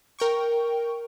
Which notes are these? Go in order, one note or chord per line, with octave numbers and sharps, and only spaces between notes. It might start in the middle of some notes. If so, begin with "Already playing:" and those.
A#4 G5 C#6